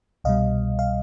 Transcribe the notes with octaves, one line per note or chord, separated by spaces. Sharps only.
C2 B2 G3 D#5 F5
F5